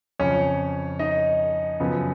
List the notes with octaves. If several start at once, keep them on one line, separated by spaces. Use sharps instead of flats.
F2 C#3 F3 C#4 C#5
D#4 D#5
F#2 C#3 F3 B3